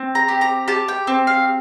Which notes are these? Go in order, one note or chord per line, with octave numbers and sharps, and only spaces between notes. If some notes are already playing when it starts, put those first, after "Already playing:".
Already playing: C4
A#5
G4
A#5
G4 A5
G5
C4
F5